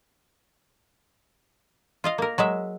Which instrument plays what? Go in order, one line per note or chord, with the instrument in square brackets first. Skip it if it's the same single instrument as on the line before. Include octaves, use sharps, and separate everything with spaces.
[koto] F4 D#5 F5
A#3 A#4
F#3 G#3 E5